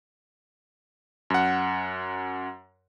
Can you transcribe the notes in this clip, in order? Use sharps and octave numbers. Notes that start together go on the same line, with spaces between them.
F#2 F#5